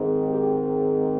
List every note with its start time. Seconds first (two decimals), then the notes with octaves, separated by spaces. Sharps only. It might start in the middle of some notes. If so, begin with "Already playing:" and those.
Already playing: G#2 D#3 G#3 C4
0.28 G4